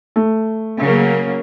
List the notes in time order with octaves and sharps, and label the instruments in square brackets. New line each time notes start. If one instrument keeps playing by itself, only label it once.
[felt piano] A3
[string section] C#3 F#3 A#3